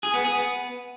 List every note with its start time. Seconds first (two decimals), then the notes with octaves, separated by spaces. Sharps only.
0.03 G#4
0.14 B3
0.25 G#4
0.35 B3